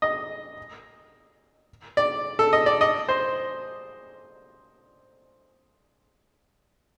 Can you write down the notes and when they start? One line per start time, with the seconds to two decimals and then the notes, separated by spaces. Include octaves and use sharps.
0.02 D#5
1.97 D5
2.39 A4
2.53 D#5
2.66 D5
2.81 D#5
3.08 C5